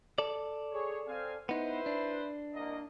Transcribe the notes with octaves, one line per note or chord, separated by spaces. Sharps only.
A4 D5
G#4 C#5
C4 F5 G#5
B3 D#4 E4 B4 C5
D4
C2 A#3 D#5